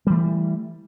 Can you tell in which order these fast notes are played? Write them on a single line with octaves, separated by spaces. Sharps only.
G3 E3 A3